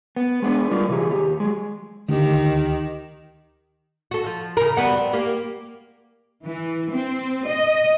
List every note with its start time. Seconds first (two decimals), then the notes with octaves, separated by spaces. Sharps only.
0.16 B3
0.42 G#3 B3 D4
0.71 G3 F4 A#4 D5
0.89 C3 E3 G4 G#4
1.10 D#2 G4
1.40 F#3 G#3
2.09 D2 D#3 G4
4.11 F#4 A4
4.26 F3
4.57 C#3 A#4
4.77 G3 B3 F#4
4.98 C4
5.13 A#3 G4
6.44 E3
6.90 C4
7.47 D#5